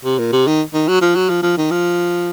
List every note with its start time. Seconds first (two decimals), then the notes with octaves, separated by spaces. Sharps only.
0.05 C3
0.18 A#2
0.33 C3
0.47 D#3
0.74 D#3
0.88 F#3
1.01 F3
1.16 F#3
1.30 F3
1.43 F3
1.58 D#3
1.71 F3